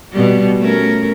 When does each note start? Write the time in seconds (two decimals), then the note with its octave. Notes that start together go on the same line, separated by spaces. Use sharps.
0.12 B2 G3
0.59 A3 C#4 A#4